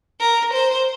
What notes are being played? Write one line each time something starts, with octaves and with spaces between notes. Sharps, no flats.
A#4
C5